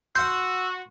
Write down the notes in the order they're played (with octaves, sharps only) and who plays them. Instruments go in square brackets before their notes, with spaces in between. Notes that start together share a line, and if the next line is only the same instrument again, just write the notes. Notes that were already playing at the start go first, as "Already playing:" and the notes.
[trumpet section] F#4 [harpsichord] F#5 C6 [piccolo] E6 [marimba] G6